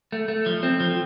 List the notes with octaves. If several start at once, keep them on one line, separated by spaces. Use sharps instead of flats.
A3
A3
F3
C4
F3